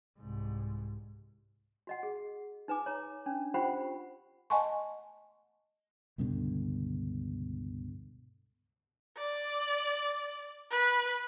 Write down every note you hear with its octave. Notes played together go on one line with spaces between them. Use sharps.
C2 G#2
F#4 D#5 F#5
G#4
D#4 B4 G#5 D6
C#5 A#5
C#4 D4
F4 G4 C5 F#5 G5 B5
D#5 F#5 G#5 A5 C6 C#6
C#2 G2 B2 D3
D5
B4